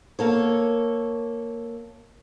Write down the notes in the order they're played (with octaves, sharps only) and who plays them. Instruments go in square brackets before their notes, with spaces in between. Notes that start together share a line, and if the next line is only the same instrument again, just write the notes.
[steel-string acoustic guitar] A#3 A4 C#5